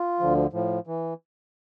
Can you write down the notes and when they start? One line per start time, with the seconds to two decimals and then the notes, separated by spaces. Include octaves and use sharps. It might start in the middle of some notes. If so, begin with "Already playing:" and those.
Already playing: F4
0.20 D2 D3 F3
0.53 A2 F3
0.87 E3